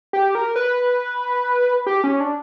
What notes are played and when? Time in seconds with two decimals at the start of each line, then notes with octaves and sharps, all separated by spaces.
0.13 G4
0.35 A#4
0.56 B4
1.86 G4
2.04 C#4
2.20 D4